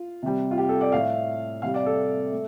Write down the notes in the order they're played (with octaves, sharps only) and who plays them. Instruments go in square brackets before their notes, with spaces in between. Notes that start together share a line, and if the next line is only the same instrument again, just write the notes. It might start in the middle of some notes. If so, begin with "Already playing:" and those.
Already playing: [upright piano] F4
C3 G3
F4
G4
A4
D5
A2 A3 F5
C3 G3 F5
D5
A4
A3